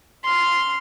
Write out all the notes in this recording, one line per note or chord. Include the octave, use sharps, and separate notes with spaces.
C6 F6